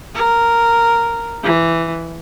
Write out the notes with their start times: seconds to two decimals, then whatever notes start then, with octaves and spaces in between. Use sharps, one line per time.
0.15 A#4
1.44 E3